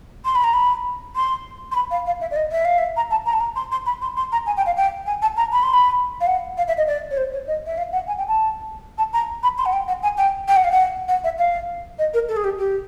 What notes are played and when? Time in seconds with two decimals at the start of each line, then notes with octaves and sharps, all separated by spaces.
0.25 C6
0.35 B5
0.44 A#5
0.53 B5
1.15 C6
1.71 C6
1.75 B5
1.90 F5
2.06 F5
2.21 E5
2.31 D5
2.36 D#5
2.51 E5
2.65 F5
2.78 E5
2.96 A#5
3.11 A5
3.26 A#5
3.33 A5
3.40 A#5
3.55 C6
3.71 C6
3.86 B5
4.01 C6
4.17 C6
4.32 A#5
4.46 G#5
4.56 G5
4.66 F5
4.76 G5
5.06 G#5
5.22 A5
5.36 A#5
5.52 B5
5.63 C6
5.73 B5
6.20 F5
6.26 F#5
6.57 F5
6.67 E5
6.77 D#5
6.87 D5
7.10 C#5
7.17 C5
7.32 C#5
7.47 D#5
7.66 E5
7.77 F5
7.92 F#5
8.07 G#5
8.18 G5
8.28 A5
8.98 A5
9.13 A#5
9.43 B5
9.58 C6
9.65 F#5
9.72 G5
9.88 F#5
10.02 G#5
10.17 G5
10.48 G5
10.56 F#5
10.64 F5
10.71 F#5
11.08 F#5
11.24 E5
11.38 F5
11.98 D#5
12.13 A#4
12.28 A4
12.36 G#4
12.44 G4
12.58 G4